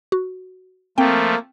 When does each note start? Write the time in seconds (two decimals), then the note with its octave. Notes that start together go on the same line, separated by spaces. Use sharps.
0.12 F#4
0.98 F3 A3 A#3 C4 G5